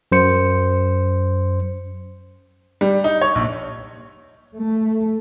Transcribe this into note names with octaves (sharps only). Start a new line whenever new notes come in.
F#2 C5 C#7
G3
D#4
C#5
A#1
A3